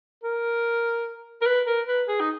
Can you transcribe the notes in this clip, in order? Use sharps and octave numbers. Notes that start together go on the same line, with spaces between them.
A#4
A#4
B4
A#4
B4
G#4
D#4